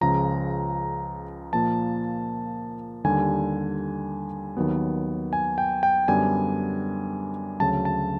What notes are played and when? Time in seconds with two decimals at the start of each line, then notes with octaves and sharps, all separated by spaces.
0.01 C#2 C#3 F3 A#5
1.53 A#2 F3 A#3 A5
3.04 D#2 D3 G3 G#5
4.57 D#2 D#3 F#3 B3
5.33 G#5
5.58 G5
5.83 G5
6.08 F#2 D3 G3 B3 D4 G#5
7.60 D2 C#3 F#3 A5
7.85 A5